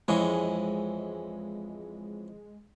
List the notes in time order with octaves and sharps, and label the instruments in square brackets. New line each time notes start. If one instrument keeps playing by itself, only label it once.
[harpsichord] F2 E3 C#4 [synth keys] G#3